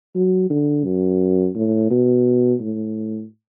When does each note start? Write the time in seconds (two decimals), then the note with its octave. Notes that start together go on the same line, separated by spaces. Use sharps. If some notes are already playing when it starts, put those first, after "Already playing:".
0.15 F#3
0.50 D3
0.85 F#2
1.55 A2
1.91 B2
2.61 A2